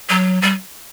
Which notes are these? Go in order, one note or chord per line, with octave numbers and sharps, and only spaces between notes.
F#3
G3